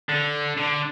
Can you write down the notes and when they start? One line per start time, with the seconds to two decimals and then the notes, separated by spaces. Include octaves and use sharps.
0.09 D3
0.57 D3